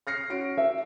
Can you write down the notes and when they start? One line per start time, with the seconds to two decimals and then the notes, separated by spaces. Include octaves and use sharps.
0.07 F6 A#6 C7 C#7
0.30 C#4 F#4 D7
0.57 E5